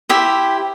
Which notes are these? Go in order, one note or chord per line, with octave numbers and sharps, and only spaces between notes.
E4 G4 C5 E5